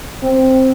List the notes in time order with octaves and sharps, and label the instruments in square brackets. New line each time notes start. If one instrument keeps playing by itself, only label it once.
[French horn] C4